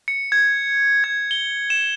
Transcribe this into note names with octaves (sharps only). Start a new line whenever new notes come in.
C#7
G#6
G#6
G7
E7